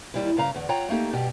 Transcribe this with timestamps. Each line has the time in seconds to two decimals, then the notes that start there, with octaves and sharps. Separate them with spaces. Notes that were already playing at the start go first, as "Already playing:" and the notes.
0.14 D#2 G3 E4
0.37 G2 C#3 F5 A#5
0.54 E2 D3
0.69 F4 C#5 F#5 G5 A#5
0.89 A3 A#3 D#4 G4 A4
1.13 G2 B2 G4